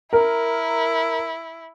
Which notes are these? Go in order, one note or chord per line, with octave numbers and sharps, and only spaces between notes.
E4 A#4